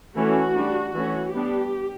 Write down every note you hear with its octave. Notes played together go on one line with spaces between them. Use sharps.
E3 A3 C#4 F#4
G3 D4
E3 A3 C#4 F#4
G3 B3 D4 G4